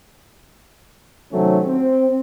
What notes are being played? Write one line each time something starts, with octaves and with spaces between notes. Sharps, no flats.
C3 D#3 F#3 A3 C4 C#4
C4